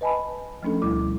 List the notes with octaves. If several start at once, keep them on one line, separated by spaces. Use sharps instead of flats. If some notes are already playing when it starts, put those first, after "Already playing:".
B4 D#5 G#5 A5 B5
F3 A3 C#4 D4 A4
D2 B2 G3 E4 D6